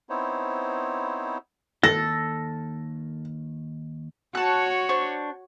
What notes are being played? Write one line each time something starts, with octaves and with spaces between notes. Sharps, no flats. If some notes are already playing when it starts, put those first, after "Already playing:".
B3 C4 D#4 E4 C5 C#5
D#2 A4 A#6
F#4 C#5 A5 F#6
D4 C5 C#6